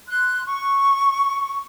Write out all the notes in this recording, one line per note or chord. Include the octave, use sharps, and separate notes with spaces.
C6 F#6
C#6